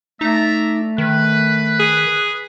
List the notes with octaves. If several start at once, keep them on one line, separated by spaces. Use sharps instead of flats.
A3 D#4 D5 E5 A#5
D#3 B4
G#4